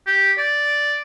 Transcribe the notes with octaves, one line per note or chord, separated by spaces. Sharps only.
G4
D5